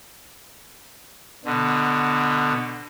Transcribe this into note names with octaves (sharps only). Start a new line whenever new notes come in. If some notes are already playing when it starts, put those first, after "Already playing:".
B2 D3